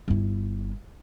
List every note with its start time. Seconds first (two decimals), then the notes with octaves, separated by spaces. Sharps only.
0.08 G1 E4